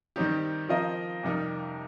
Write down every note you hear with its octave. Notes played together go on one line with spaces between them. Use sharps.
D#3 G3 C4 D#4 G4
F3 C4 F4 A#4 D#5
F2 C3 G3 D#4 A#4